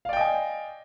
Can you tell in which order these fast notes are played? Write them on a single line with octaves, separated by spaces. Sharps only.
F5 D5 G5 D#5 G#5